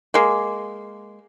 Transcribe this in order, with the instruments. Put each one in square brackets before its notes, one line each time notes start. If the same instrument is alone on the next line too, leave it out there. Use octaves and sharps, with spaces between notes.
[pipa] G#3 A#3